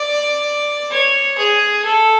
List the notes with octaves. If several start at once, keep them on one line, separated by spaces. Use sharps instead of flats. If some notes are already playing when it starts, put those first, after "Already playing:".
Already playing: D5
C#5
G#4
A4